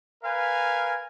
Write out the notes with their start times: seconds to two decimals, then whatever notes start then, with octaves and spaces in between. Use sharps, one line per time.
0.24 A#4 B4 F5 G#5